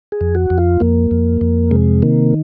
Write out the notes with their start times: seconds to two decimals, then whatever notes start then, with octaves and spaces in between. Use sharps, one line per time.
0.12 G#4
0.21 F2
0.35 F#4
0.50 F2
0.58 F4
0.80 F2 A#3
1.11 F2
1.41 F2
1.71 C3 G#3
2.02 D#3 A#3